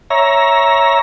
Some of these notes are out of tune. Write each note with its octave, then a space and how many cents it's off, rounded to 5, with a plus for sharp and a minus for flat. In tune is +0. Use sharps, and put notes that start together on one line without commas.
C#5 +0 E5 +0 A#5 +15